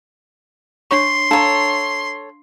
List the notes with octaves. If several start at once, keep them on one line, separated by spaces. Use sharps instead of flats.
D4 C#5 C6 C#6
D4 A4 C#5 F5 A#5